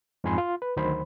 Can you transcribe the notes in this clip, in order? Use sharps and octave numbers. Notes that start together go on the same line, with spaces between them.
F2 G#2 F4 G#5 B5 C6
F4
B4
D2 D#3 F#3 C5 B5